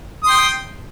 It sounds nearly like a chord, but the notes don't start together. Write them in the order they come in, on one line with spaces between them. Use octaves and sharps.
D#6 C6 G5